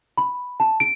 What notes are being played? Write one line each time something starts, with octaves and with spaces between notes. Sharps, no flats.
B5
A5
D7